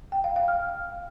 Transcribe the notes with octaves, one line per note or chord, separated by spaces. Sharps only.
G5
F5
F5
F6